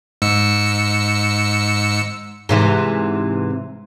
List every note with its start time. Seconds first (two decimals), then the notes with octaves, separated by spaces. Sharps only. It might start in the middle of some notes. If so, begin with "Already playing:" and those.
0.22 G#2 E6 C#7
2.49 G#2 C3 E3